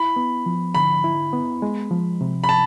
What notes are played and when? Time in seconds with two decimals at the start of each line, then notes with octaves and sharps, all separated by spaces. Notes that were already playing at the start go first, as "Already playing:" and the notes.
Already playing: E4 B5
0.16 B3
0.46 F3
0.75 D3 B5
1.04 E4
1.33 B3
1.62 G#3
1.91 F3
2.21 C3
2.44 B5
2.49 A5